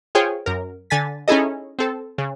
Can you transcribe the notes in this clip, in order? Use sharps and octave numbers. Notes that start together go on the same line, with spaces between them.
F4 G#4 C5 C#5 G5
F#2 A#4
D3 G#5 A6 B6
C#4 D#4 E4 G#4 A4 D#5
C4 A4
C#3